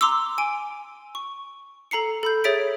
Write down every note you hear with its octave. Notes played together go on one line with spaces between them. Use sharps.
A#5 C6 D6 E6
G#5 D7
C#6
A4 A#5 C7 C#7
A4 B5 G6
G#4 C#5 E5 A6 B6 D7